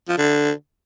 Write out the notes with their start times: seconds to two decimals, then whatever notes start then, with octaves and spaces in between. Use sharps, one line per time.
0.09 F3
0.18 D3